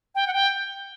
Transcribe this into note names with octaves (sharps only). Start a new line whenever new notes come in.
G5
F#5
G5